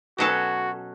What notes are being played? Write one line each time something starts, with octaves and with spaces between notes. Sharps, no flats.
B2 F#3 C#4 F#4 A4